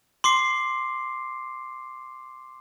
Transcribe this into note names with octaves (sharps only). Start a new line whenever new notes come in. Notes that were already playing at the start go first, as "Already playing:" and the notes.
C6 D6 C7